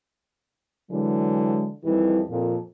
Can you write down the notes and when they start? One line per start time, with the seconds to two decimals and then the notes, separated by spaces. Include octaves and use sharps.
0.91 D3 E3 F#3 G#3
1.84 F2 D#3 E3 G3 G4
2.29 F2 A#2